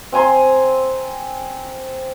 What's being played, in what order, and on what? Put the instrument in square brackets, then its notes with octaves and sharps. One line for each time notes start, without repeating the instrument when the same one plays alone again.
[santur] C4 G#5 A#5 C6